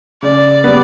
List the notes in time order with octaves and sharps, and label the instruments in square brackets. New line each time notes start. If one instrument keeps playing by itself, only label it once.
[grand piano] C#3 [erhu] D5
[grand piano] G3 B3